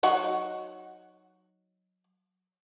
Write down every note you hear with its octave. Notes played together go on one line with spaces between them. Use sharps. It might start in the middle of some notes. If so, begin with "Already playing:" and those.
F#3 D#4 F#4